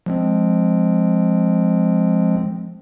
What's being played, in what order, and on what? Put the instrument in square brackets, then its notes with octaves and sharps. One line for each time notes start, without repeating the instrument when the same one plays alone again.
[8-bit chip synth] F3 G#3 C4